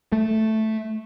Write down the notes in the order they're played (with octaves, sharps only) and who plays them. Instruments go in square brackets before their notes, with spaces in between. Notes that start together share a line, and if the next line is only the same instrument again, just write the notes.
[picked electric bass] A3